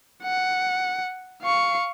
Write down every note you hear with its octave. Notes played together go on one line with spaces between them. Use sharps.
F#5
F5 C#6